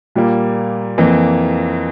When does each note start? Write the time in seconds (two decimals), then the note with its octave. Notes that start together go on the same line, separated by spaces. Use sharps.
0.15 A#2 G3 A#3
0.98 F2 E3 A#3